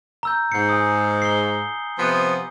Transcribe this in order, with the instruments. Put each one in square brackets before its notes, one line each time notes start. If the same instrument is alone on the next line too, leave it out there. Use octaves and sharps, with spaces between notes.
[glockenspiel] A#5 E6 G6
[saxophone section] G#2 [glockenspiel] G6 C7 C#7
[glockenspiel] G#5 D#6
C7 G7
[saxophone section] C3 F3 B3